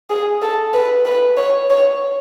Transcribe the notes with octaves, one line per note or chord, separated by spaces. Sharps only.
G#4
A4
B4
B4
C#5
C#5